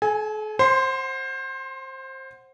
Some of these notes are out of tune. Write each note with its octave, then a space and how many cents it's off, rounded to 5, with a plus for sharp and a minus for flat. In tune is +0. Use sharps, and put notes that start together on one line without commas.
A4 -45 G#5 +0
C5 +20 F#5 +0 C6 -10